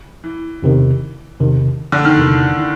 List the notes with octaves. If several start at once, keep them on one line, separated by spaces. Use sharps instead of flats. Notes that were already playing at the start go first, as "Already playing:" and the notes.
E3
E2 C3 D#3
E2 C3 D#3
D3
D#3
E2 C3 D#3 E3
E3